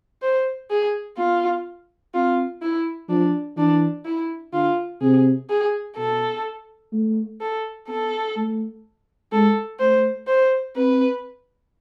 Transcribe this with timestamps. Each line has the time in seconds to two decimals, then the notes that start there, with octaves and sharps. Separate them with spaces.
0.22 C5
0.70 G#4
1.17 B3 F4
2.14 C4 F4
2.62 E4
3.09 F3 D4
3.57 E3 D4
4.05 E4
4.53 D3 F4
5.01 C3 G#4
5.49 G#4
5.97 B2 A4
6.92 A3
7.41 A4
7.88 B3 A4
8.36 A3
9.32 G#3 A4
9.80 A3 C5
10.27 C5
10.76 C4 B4